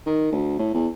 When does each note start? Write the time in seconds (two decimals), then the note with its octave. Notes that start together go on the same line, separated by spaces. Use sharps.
0.06 D#3
0.32 D2
0.59 A2
0.74 E2